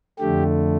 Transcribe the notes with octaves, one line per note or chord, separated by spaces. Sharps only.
F2 D3 A3 G4